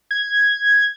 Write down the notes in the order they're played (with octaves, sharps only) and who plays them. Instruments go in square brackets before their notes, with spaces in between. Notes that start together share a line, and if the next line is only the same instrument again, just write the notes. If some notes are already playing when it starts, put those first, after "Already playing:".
[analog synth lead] G#6